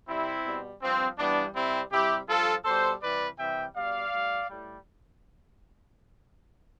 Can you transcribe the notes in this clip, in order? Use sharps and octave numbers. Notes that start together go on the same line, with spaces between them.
C3 G3 C4 E4
B2 G3
G2 F3 C4
G2 E3 G3 B3 D4
C3 G3 C4 E4
C3 G3 E4 G4
G2 F3 F4 A4
B2 G3 A4 C5
C3 E3 G3 B4 D5
C3 E3 G3 E5 G5
B2 G3 D5 F5
A2 G3
A2 G3